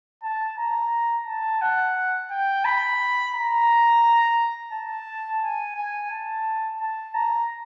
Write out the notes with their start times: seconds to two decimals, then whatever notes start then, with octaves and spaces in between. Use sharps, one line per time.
0.23 A5
0.58 A#5
1.27 A5
1.61 F#5
2.31 G5
2.65 B5
3.34 A#5
4.72 A5
5.42 G#5
5.76 G#5
6.11 A5
6.80 A5
7.14 A#5